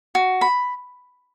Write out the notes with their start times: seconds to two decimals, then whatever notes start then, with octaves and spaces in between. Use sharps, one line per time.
0.15 F#4
0.41 B5